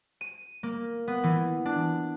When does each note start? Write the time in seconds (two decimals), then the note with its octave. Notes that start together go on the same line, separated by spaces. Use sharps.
0.21 D#7
0.63 A#3
1.08 B3
1.24 E3
1.65 D4